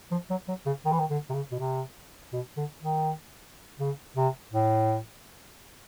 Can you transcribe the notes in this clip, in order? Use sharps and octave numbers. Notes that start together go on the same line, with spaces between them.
F3
F#3
F#3
C#3
D#3
E3
D#3
D3
C3
C#3
B2
C3
B2
D3
D#3
C#3
C3
A2